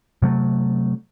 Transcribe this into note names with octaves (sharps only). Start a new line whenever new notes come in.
C3 F#3 A3